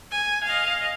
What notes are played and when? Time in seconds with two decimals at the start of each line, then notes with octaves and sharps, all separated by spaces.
0.11 G#5
0.44 D#5 F5